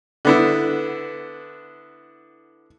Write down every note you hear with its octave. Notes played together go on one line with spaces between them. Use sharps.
D3 B3 E4